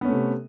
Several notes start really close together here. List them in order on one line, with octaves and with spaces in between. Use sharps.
B3 C#4 A3 C3